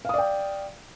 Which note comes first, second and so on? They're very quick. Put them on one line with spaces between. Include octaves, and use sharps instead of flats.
F5 D#6 D5 G5